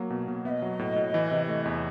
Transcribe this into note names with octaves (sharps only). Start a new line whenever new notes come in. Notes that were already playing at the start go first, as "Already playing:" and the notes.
Already playing: F#3 A#3
B2
B2
B3 D#5 E5
F#3
A2
A2
E3
C3
A3
E2